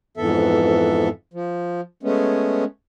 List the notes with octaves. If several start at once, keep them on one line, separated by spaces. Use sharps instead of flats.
F2 G#2 E3 B3 A4 E5
F3
G#3 A3 B3 C#4